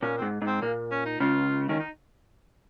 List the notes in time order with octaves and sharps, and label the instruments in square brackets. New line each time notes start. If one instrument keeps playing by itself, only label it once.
[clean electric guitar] A#2 [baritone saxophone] C#4
[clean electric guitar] G#2 [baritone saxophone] C4
[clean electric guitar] G#2
[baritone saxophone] C4
[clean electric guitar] A#2 [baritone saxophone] A#3
[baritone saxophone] C#4
D#4
[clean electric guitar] C#2 C#3 [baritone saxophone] F4
[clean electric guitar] D#3 [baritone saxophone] C#4
[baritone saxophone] D#4